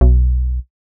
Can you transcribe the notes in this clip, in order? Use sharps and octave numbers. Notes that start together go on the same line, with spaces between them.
B1